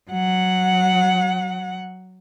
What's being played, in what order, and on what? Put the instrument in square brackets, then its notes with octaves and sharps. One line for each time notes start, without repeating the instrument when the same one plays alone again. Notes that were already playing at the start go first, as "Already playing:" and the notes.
[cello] F#3 F#5